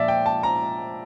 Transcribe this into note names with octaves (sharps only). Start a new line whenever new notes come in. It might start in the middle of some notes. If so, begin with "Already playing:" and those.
Already playing: A#2 F3 D5 E5
G5
A5
A#5